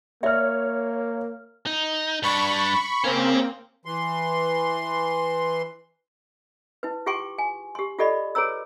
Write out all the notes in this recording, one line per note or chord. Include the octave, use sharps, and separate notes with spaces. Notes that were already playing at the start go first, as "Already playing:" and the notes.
A#3 C#5 D5 E5 F6
D#4
G2 D4 B5 C#6
A#3 C4 C#4 G#4
E3 C6
E4 B4
F4 G4 G#4 G5 C6 C#6
G#5
G4 C6
F4 G4 A4 D5 D#5 B5
G#4 B4 C#5 A#5 E6